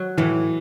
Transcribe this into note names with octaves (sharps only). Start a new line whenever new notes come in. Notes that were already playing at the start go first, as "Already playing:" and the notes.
Already playing: F#3
A2 E3